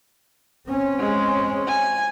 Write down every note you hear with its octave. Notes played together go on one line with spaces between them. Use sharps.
C4 C#4
G#3
G#5